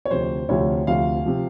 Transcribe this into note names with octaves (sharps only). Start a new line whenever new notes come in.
C#5
D2 C3 F3 C5
D2 C3 F3 C#5
D2 C3 F3 F5
C3 F3